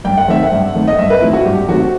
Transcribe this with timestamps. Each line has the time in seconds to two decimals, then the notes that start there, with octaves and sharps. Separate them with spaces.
0.04 G2 G5
0.18 F#5
0.28 D#3 A3 C4 E5
0.43 F#5
0.52 G2
0.75 D#3 A3 C4
0.88 D#5
0.98 G2 E5
1.10 B4
1.21 D#3 A3 C4 E4
1.33 F#4
1.45 G2 G4
1.68 D#3 A3 C4 F#4